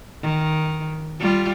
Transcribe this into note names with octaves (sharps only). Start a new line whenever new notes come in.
D#3
G3 F4